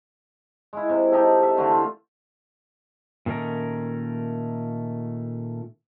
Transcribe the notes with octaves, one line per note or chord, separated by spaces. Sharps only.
G#3 E4
C3
D#4 G4 A4
E5
D3 E3 A3 C6
F4
A#2 D#3 A3 C#4 A#4